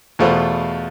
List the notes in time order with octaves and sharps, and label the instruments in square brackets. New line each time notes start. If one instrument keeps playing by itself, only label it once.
[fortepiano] E2 B2 A3 F4 C5